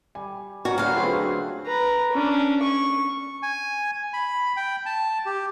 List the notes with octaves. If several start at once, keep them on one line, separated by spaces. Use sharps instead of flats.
G3 G#5
C#4 F#4 A#4
D2 D3 F#3 B4 F5
F#3 C4 F4 G#4 B4
A3
B4 A#5
C#4 D4
C#6
G#5
B5
G5
A5
G4